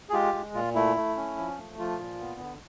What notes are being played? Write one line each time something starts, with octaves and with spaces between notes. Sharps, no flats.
G#4
G#3 F4 G4
G#3
A#2 F4
A3 E4
A3
C#4
F3
A3
F3 F4
A#2
B3
D3